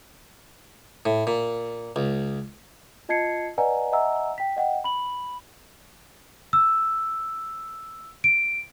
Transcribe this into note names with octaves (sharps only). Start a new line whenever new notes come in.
A2
A#2
C#2
F4 D#5 A5 G#6 C7 C#7
B4 D5 D#5 F#5 G#5 A#5
D#5 E5 F#5 G#5 A#5 E6
G5 B6
D#5 F#5 G5
B5 F#7
E6
D7